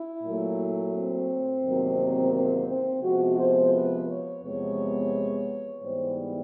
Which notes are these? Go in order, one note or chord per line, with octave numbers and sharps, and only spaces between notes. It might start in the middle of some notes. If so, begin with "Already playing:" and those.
Already playing: E4
A#2 F#3 A3
C4
E2 C3 D#3 F#3 A#3
C4
C4
C3 F3 G#3 B3 F#4
C5
B4
C#5
E2 C3 F3 G#3 B3 C#5
G#2 E3 G3 B3 C5